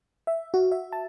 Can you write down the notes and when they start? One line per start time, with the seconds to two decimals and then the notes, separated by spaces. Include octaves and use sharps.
0.27 E5
0.54 F#4
0.72 E5
0.92 A5